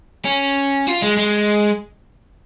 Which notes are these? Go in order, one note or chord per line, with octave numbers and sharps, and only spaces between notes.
C#4
F4
G#3
G#3